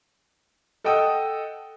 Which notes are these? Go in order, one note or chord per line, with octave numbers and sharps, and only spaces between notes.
A4 D#5 F#5 G5 D#6 E6